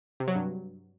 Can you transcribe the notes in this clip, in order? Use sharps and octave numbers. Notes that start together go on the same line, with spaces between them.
C3
F#3
G2